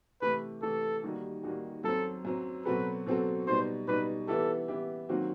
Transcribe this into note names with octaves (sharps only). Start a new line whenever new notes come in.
C3 E3 A3 B4
C3 E3 A3 A4
D#2 D#3 G3 D#4 F#4
D#2 D#3 G3 D#4 F#4
F#2 F#3 C4 A4
F#2 F#3 C4
B2 F#3 C4 F#4 A4 B4
B2 F#3 C4 F#4 A4
B2 G3 D#4 C5
B2 G3 D#4 B4
E3 B3 E4 G4 A4
E3 B3 E4 G4
D#2 D#3 F#3 C4 F#4